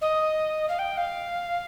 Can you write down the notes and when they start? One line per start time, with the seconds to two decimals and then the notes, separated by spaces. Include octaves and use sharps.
0.01 D#5
0.68 F5
0.78 G5
0.97 F5